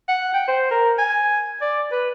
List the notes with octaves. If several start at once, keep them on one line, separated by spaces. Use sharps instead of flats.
F#5
G5
C5
A#4
G#5
D5
B4